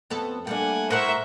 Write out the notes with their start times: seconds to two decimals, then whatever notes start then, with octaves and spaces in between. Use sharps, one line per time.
0.10 F2 B3 A4
0.47 G3 A3 A#3 D4 F#5 G#5
0.91 A2 A#4 C5 E5 F#5 C#6